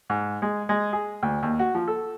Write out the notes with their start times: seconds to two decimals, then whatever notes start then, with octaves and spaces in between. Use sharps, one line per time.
0.10 G#2
0.42 G#3
0.69 G#3
0.93 G#4
1.23 D2
1.43 D#2
1.59 F#4
1.75 F3
1.88 A4